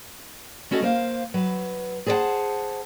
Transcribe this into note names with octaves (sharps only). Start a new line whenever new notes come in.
A3 C#4 F#4 A4 C5 D#5
A#3 C5 F5
F#3 B4
G#4 A4 C5 D5 F#5 A5